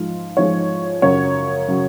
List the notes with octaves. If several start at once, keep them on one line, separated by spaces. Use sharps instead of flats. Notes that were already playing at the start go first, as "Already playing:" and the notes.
Already playing: G#2 F3 G#3 F4
G#2 F3 G#3 C#5
F#2 C#3 F#3 C#5
C#3 F#3